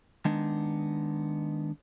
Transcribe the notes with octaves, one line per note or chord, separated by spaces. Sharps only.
D#3 G#3 B3 D4 D#4